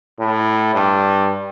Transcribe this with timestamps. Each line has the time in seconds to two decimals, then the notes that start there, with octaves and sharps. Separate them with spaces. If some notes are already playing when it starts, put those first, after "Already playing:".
0.19 A2
0.74 G2